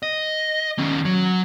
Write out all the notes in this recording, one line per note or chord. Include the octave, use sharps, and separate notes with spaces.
D#5
D#3 C#4
F#3